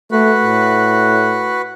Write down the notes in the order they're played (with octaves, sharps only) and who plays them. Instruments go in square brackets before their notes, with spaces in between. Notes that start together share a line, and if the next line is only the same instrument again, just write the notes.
[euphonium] A3 [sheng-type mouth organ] F#4 B4
[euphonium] A2